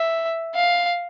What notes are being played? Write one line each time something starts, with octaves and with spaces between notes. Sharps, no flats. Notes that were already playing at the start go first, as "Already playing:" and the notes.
Already playing: E5
F5